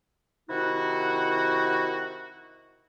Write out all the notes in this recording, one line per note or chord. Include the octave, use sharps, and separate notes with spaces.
C3 D#3 D#4 E4 F#4